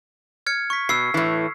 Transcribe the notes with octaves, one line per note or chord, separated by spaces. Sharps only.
F6 G#6 C#7
C#6 B6
B2 E6 C7
A2 E3